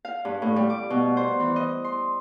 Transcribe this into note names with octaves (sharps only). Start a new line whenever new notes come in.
F5
G2
A2
G3
D6
B2
C5
E3
D#5
C6